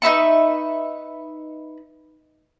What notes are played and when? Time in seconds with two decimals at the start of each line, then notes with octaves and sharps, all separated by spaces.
0.02 D#4 B4 E5 C#6